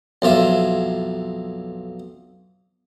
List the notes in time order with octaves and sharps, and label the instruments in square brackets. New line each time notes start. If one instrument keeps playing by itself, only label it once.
[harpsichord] B1 F2 F4 E5